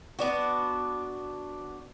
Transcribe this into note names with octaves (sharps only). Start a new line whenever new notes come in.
B3 D4 F#4